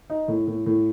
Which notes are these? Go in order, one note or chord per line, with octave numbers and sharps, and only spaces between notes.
D#4
A2
A2
A2